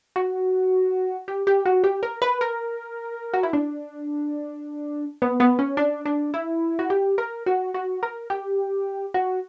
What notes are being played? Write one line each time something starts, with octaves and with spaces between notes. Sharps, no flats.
F#4
G4
G4
F#4
G4
A#4
B4
A#4
F#4
E4
D4
B3
B3
C#4
D4
D4
E4
F#4
G4
A#4
F#4
F#4
A#4
G4
F#4